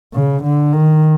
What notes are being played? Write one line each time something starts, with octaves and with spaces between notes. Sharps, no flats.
C#3
D3
D#3